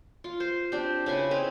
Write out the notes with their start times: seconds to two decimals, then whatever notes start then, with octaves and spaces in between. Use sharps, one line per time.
0.24 F4
0.40 C5
0.72 C4 D4 G4
1.06 C#3 E4 B4 G#5
1.31 C4 D#4 B4